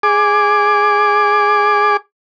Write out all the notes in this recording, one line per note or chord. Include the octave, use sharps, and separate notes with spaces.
G#4 D6